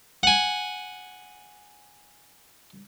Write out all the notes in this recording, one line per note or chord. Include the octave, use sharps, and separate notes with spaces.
F#5 G#5